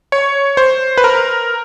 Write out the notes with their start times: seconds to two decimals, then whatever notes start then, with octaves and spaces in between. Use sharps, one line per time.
0.12 C#5
0.57 C5
0.98 B4
1.04 A#4